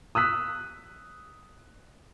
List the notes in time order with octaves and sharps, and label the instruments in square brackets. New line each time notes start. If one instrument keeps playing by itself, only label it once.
[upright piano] D#6 E6 F#6 B6